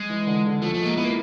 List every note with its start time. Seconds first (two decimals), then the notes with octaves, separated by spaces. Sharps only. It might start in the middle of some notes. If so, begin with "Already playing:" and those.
Already playing: G#3
0.10 E3
0.27 D3
0.45 D3
0.62 F3 A3
0.74 A3
0.80 G#3
0.85 A#3
0.97 B3 E4
1.04 A#3